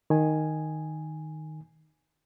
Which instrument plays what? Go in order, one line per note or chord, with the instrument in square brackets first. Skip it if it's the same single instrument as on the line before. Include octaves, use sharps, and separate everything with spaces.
[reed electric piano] D#3 G#5